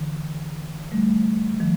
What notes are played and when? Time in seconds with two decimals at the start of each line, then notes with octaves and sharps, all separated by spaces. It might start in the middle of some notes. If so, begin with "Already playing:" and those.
Already playing: D3 E3
0.92 G3 A3
1.60 D#3 F3